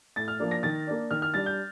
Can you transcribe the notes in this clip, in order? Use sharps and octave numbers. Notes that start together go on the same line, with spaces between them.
A2 A6
F6
F3 A#3 D4
A#6
D#3 A6
A#3 D4
D#3 F6
F6
G3 D4 A6
G6